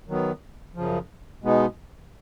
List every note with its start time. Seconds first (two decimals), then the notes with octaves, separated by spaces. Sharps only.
0.08 D#3 F#3 B3
0.75 F#2 C#3 F3
1.43 B2 G#3 B3 D#4